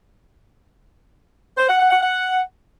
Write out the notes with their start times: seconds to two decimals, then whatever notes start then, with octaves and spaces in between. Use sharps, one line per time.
1.58 C5
1.69 F#5
1.80 F#5
1.91 F#5
2.02 F#5